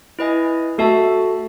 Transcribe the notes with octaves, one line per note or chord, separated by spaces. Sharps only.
E4 B4 D#5 G#5
A3 F#4 A4 E5 A5